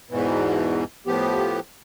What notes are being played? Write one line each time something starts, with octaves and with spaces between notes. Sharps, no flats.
E2 G#2 B2 E3
A2 F3 B3 G4